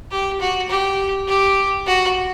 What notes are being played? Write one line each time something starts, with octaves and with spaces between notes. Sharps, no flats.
G4
F#4
G4
G4
F#4